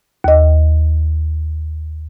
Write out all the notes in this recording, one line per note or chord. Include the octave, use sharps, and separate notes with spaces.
D#2 D#5